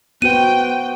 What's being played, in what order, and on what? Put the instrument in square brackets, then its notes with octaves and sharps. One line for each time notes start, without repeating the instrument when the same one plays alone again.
[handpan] B3 F#4 C5 [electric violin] G5 [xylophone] D#7